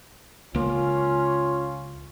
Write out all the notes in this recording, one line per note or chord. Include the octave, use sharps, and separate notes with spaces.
C#2 A#3 C#4 F4